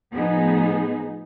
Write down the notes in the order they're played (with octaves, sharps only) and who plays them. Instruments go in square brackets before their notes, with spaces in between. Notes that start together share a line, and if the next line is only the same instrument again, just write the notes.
[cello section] A2 F3 B3 D#4 G#4